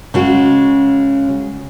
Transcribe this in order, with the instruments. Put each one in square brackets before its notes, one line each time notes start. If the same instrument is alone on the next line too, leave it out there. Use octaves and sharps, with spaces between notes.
[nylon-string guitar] C#3 G#3 F#4